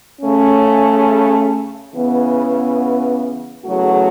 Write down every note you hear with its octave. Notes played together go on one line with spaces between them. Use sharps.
C#3 A3 C#4
C#3 E3 B3
E2 C#3 F#3 A3 F#4